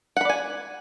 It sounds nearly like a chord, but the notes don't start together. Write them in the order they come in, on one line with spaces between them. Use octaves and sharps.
F#5 B5 D5 G#5